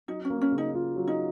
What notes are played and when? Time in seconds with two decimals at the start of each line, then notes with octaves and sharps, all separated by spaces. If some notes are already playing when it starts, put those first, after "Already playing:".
0.08 F#3 D#4
0.25 C#4
0.30 A#3
0.42 C#4
0.52 C#3
0.58 D#4
0.75 F4
0.96 F#3
1.07 D#4